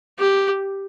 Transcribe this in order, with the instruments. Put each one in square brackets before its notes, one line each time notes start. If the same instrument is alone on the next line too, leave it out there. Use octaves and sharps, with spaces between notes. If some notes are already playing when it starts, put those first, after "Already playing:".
[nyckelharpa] G4